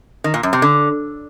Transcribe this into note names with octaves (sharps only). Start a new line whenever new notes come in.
D#3
A#2
F#2
C3
D3